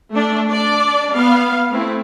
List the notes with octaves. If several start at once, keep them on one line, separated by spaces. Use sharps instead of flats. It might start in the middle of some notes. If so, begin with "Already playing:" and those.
A3 D4
D4 D5
B3 F5
A3 C4 E4